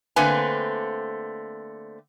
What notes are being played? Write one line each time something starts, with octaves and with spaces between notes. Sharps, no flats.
D3 A3 A#3 C4 B4 G#5